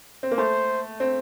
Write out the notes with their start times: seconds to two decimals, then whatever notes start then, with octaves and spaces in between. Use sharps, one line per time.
0.23 C4
0.31 A#3
0.38 A3 C5
1.00 C4